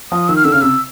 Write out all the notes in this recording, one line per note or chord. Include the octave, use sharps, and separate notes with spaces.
F3 D#6
D#3 E6
F6
D3 E6
C#3 F6
C3 E6